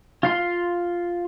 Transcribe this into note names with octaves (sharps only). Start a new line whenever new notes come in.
F4 F5 C6